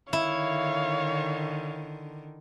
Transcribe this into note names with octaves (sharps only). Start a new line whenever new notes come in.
D3 D#3 E4 C#5 F5